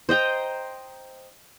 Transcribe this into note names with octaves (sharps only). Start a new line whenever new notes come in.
C5 D#5 G5 A#5